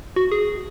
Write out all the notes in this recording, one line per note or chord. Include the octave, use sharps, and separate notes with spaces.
F#4
G#4